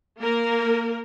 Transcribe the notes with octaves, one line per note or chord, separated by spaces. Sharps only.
A#3 A#4